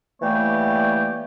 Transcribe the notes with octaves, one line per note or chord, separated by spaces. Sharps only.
E3 G3 A3 A#3 G4 C#5